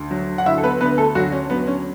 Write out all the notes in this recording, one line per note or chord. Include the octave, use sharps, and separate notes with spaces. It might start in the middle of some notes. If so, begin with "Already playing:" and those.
Already playing: D2
F#3
F#5
D2 E4 E5
A4
B3 B4
D3 B3 B4
A3 A4
D2 F#3 F#4
C#4
F#3 B3
C#4